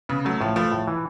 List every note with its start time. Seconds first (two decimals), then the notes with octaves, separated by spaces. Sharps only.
0.09 C#3 B3
0.25 F#3 A3
0.41 A2 F3
0.56 F3 A3
0.72 A2
0.87 E3